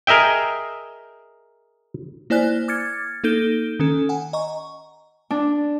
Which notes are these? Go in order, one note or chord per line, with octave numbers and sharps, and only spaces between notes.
G#4 A#4 D#5 E5 G5
A#3 E4 C5 D5 G#5 F#6
D6 F6 G#6 A6 C#7
A#3 D#4 A4 G6 D7 G7
D#3 C#4 A4
F#5 G#5
D#5 A#5 C#6
D4